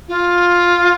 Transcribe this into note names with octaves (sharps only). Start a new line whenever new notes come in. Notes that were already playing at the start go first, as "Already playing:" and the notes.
F4